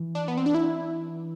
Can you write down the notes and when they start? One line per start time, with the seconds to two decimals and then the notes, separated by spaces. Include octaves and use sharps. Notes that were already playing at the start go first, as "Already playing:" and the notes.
Already playing: E3
0.15 D4
0.28 B3
0.37 C4
0.46 D4
0.55 E4